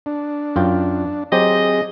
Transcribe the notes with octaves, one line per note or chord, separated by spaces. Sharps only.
D4
F#2 F4 G5
F#3 C4 G4 G#4 C5 D#5